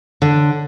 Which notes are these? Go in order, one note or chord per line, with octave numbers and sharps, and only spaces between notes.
D3